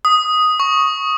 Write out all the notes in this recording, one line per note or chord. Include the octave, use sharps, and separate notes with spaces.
D#6
C#6